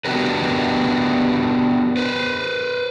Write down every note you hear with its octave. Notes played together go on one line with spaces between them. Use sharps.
B3 D4 F#4 G4 A#4 B4
B4 C5